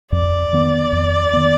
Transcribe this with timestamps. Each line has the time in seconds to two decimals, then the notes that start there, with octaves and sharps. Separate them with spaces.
0.12 F2 D5
0.53 D#3 B3
0.93 F2
1.33 D#3 B3